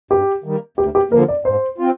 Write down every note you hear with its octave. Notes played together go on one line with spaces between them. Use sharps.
G2 G4
D#3 G3 A#3
D2 G4
G4
D3 F3 A#3 A#4
D5
G#2 C5
C4 F4